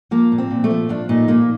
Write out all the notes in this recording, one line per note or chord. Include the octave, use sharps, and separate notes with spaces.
F3 A#3
A#2
C4
A#2
A3
F3
F3 D4
A#2 D#4
A#2 A#3